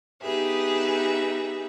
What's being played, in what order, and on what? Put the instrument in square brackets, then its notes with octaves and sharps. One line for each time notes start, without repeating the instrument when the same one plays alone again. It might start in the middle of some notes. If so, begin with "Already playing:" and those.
[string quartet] B3 D#4 G4 G#4 B4 E5